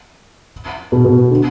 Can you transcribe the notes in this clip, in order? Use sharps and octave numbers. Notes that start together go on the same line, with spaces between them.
B2
B2
D3